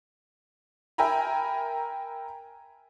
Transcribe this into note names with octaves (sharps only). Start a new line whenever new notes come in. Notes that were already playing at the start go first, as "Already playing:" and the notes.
A#4 E5 G5 G#5 A#5 B5